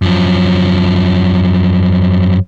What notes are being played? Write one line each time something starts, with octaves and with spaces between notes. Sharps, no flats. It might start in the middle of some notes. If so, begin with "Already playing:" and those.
F#2 F3